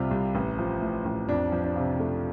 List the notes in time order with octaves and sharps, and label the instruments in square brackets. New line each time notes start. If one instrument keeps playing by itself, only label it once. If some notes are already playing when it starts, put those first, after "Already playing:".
Already playing: [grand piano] C2 C3 G3 F4 G4
C2
A1
F3
A2
A1
F2 D4
F3
D4
C3 F4
A3